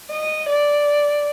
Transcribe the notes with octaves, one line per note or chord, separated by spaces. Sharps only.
D#5
D5